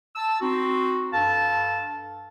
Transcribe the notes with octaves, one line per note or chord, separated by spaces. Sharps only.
A5 E6
C4 D#4 F#4
G2 A4 F5 A5